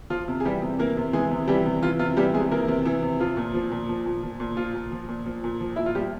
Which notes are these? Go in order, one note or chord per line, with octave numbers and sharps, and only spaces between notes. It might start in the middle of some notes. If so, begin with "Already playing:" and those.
F3 F4
C3
G#4
E3 G3 G4
C3
E3 A#3 A#4
C3
E3 G#3 G#4
C3
E3 G3 G4
C3
E3 F4
C3 F4
E3 G3 G4
C3 G#3 G#4
E3 A#3 A#4
C3
E3
C3
F3 F4
A#2
F3
A#2
F3
A#2
F3
A#2
F3 F4
A#2
F3
A#2
F3
A#2
F3
A#2 E4
F4
F3 G3 G4